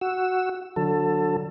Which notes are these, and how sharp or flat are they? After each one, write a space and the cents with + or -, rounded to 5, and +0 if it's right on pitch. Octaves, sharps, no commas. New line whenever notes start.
F#4 +0 E6 +0
D3 +0 F#3 -20 A4 +20